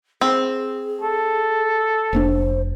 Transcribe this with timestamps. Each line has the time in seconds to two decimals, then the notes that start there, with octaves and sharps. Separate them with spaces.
0.21 C4 G#4
1.01 A4
2.13 F1 A#3 D4 C5